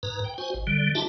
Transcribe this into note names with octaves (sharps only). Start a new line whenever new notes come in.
G#2 B4 A#5
G5
F#4 C5 G#5
G#1
D3 G3
D#4 F4 G4 E5 A5